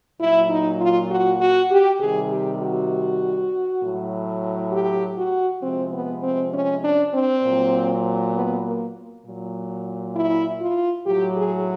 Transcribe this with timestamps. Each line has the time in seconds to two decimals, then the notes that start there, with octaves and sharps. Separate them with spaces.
0.20 A#2 F#3 E4
0.50 D#4
0.80 F4
1.11 F#4
1.41 F#4
1.71 G4
2.01 C3 D#3 G3 G#4
2.31 G4
2.61 F#4
3.82 A2 F#3
4.73 G4
5.18 F#4
5.63 C3 F3 G#3 C4
5.94 B3
6.23 C4
6.54 C#4
6.84 D4
7.14 C4
7.44 A#2 F#3
8.35 B3
8.65 A#3
9.25 A#2 F#3
10.15 E4
10.61 F4
11.06 A2 F#3 G4
11.36 G#4